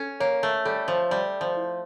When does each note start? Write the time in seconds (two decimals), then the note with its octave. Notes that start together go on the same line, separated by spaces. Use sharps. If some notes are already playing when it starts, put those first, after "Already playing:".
Already playing: C#4 A4
0.20 A#3 C#5
0.43 A3
0.65 G3 A4
0.88 F3
1.11 G3 D5
1.41 F3
1.56 E4